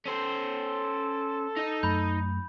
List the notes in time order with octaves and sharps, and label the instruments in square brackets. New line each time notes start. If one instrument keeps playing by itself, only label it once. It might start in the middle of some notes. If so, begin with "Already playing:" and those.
[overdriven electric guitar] C#4 C5 [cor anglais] A4
[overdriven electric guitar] D#4 D#5
[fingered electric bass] F#2 A3 [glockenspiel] B5 G6